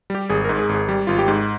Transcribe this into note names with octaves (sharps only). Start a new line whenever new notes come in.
G3 G4
G#1 G#4
A#4
G#2
G#4
G#1
G#4
G3 G4
G#1 F4
G4
G#2